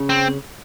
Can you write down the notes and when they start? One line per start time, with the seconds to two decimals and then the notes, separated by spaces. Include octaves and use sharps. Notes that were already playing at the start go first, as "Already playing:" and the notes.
Already playing: C#3
0.10 C4